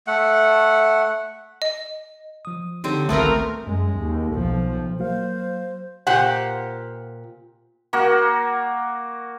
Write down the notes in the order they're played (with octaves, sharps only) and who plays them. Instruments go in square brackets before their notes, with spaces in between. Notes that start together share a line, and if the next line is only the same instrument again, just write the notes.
[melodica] A3 F#5
[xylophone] D#5
[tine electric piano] F3 D#6
[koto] D3 C4 [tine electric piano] D#4 G4 C#5
[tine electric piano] G#1 C#2 D#3 [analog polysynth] A3 A#4 [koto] B3 C4 F4
[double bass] F#2 G#3
D#2
B1 F3
[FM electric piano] F#3 A#3 F5 [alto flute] C5
[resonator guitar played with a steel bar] A#2 G4 C5 F#5
[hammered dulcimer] A#3 F#4